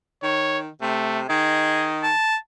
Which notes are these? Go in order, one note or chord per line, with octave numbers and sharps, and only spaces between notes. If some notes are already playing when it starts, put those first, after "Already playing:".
D#3 C#5
C3 A3
D#3 G#4 D#5
A5